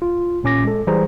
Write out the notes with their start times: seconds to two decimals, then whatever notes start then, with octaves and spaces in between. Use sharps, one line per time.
0.02 F4
0.43 B1 A#2 C#4 D6 A#6
0.64 G#3 A4
0.87 E3 G3 G#4 C5 A#5